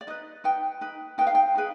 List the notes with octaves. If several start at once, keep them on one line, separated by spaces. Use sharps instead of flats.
D5
D#4 B4 D#5
D#4 B4 G5
D#4 B4
D#4 B4 G5
F5
G5
D#4 G#4 B4